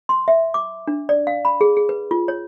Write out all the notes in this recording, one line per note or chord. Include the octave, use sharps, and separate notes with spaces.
C6
E5
D6
D4
D5
F5
B5
G#4
G#4
B4
F4
C#5